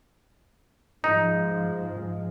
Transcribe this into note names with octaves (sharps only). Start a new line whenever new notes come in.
G#2 F3 G#3 D#4